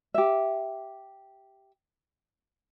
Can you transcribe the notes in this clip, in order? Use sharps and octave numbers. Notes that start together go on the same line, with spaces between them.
G4 E5